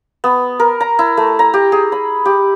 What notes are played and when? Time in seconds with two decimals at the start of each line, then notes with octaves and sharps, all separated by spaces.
0.24 B3
0.60 A#4
0.80 A#5
0.99 E4
1.17 A3
1.39 A#5
1.54 G4
1.72 G#4
1.92 B5
2.26 G4